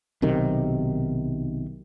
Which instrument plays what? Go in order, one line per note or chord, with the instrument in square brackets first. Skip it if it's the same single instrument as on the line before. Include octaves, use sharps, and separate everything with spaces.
[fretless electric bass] B1 C3 D#3